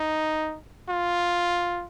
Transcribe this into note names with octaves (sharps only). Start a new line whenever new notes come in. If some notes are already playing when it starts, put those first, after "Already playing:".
Already playing: D#4
F4